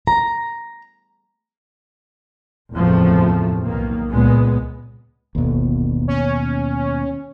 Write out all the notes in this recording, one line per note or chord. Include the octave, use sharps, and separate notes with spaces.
A#5
F#1 E2 A2 C3 F3 A3
B1 D#3 A#3
C#2 A#2 G#3 B3
G1 D#2 B2
C#4